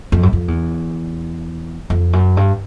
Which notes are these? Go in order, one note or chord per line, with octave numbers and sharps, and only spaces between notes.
F2
F#2
F2
E2
F2
F#2
G2